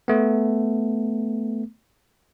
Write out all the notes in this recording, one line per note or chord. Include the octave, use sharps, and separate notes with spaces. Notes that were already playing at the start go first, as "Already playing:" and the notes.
A3 B3